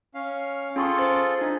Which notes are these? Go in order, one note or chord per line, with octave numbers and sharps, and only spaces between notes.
C#4 F5
C#4 F4 G#4 A4 C6 C#6
C5 A6
D4 D#4